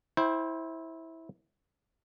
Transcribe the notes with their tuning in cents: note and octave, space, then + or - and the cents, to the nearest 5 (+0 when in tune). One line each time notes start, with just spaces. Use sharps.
E4 -15 C5 +10 G5 +0